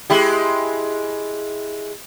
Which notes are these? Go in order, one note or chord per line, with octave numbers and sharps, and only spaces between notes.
G#3 E4 G4